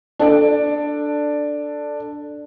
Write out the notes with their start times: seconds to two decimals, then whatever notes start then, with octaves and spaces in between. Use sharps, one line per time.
0.19 D4 A4 D5